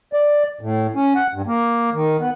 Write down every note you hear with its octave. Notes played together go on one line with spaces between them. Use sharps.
D5
A2
C#4
F#5
G2
A#3
D#3
B3